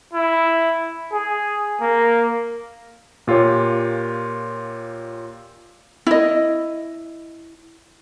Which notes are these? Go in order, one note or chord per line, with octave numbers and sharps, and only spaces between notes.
E4
G#4
A#3
A#2 F4 G4 C#5
E4 D#5